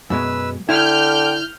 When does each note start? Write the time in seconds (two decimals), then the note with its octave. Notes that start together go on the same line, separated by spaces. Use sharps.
0.10 F#2 B2 G#3 B4 E6
0.69 D3 E4 G5 F6 G6